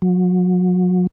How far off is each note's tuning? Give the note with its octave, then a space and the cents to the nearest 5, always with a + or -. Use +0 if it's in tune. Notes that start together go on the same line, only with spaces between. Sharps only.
F#3 -35